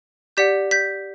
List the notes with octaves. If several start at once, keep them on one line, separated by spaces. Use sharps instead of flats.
G4 D5 F#5 G6 B6
G6 B6